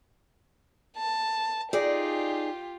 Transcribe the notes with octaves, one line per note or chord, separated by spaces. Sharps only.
A5
D#4 F4 G4 G#4 D5